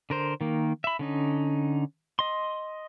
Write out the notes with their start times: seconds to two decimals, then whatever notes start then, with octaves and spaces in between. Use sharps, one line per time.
0.10 D3 A#4 C5
0.41 D#3 A#3
0.84 E5 B5
0.99 D3 C#4 D#4
2.19 D#5 C6